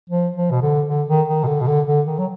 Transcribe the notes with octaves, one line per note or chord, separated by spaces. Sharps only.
F3
F3
B2
D3
D3
D#3
D#3
B2
D3
B2
D3
D3
D#3
F#3